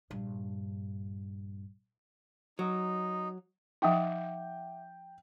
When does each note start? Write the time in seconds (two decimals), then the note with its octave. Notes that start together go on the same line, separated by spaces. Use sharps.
0.11 A#1 G2
2.59 F#3 D#4
3.82 F3 D#4 E5 F#5 G5 D6